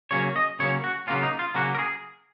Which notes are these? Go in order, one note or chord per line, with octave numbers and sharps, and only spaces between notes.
C#3 F#3 A#3 C#4 C#5
D#5
C#3 F#3 A#3 C#4 C#5
F#4
C#3 F#3 A#3 C#4 F4
D#4
F4
C#3 F#3 A#3 C#4 F#4
A#4
G#4